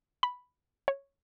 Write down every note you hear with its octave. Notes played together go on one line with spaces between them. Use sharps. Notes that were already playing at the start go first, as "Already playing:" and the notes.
B5
C#5